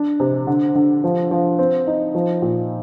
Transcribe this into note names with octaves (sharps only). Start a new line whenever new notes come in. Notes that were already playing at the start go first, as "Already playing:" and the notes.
Already playing: D4
C3
D3
D3
F3
F3
C4
D#4
F3
A#2